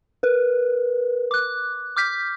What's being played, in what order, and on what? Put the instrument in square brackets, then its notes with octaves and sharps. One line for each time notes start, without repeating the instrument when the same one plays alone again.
[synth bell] A#4 B4
D6 F#6
D6 F6 G6 B6